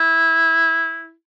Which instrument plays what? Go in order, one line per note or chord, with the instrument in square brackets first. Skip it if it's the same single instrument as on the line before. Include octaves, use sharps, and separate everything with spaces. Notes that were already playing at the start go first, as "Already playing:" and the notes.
Already playing: [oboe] E4